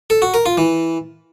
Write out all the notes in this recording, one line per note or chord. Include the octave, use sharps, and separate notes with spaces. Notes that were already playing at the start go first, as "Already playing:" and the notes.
A4
F#4
A#4
F4
E3